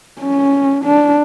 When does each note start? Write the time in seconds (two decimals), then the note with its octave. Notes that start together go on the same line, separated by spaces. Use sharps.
0.20 C#4
0.84 D4